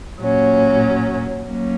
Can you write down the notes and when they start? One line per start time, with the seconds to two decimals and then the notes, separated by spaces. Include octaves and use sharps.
0.20 A#2 F#3 C#4
1.46 F#3 A#3 C#4